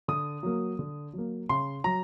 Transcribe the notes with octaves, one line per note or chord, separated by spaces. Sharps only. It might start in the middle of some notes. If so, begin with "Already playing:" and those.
D3 D#6
F#3 A#3
D3
F#3 A#3
C#3 C6
F#3 A#5